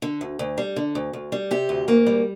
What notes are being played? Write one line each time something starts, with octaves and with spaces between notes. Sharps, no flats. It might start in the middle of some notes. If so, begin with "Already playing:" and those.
D3
D2
D2
G3
D3
D2
D2
G3
C3 G4
D2
D2 A#3
G3